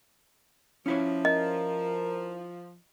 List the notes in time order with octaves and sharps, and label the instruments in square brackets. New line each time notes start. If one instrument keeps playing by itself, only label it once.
[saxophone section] F3 [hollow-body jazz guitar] C#4 E4 C#5
[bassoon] A#4 [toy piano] D#5